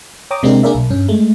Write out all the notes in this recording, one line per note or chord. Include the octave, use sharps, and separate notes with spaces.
C#5 G5 A#5 D6 D#6
C3 G#3 C4 D4 G4 A#4
A#3 D4 G#4 A#4 D5 E5
B1
G2 C#4
G#3 A3